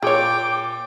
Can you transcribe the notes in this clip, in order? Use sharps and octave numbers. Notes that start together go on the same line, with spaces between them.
A#2 G#4 C#5 G5 D6